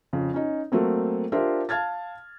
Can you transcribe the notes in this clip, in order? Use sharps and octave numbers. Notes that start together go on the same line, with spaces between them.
F2 C#3
C#4 D#4
F#3 A3 A#3 C4
D4 F4 G4 A#4 C5 E5
F5 A5 F6 G#6 A6